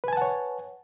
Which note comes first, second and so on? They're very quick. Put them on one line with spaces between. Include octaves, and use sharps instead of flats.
B4 G#5 A5 F#5 C#5